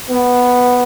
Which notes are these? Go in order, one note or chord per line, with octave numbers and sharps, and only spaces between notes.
B3